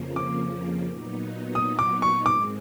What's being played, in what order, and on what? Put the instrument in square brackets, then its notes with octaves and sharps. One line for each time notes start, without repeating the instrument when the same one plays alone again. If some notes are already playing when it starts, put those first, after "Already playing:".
Already playing: [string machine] F2 C#3 F3 A#3
[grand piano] D6
[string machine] A#2 F#3 B3 D#4
[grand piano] D#6
D6
C#6
[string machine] G#2 D#3 G#3 C4 [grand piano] D6